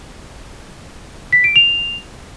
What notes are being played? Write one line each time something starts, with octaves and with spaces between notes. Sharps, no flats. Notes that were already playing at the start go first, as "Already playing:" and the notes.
B6
D7
F7